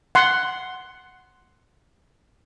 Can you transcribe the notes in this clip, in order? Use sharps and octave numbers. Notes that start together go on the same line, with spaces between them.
F#5 C6